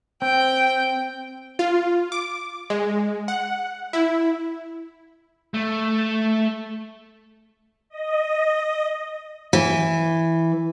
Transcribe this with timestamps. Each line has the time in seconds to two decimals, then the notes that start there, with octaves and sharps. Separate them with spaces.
0.22 C4 G5
1.59 F4
2.12 D6
2.70 G#3
3.28 F#5
3.93 E4
5.54 A3
7.89 D#5
9.53 E3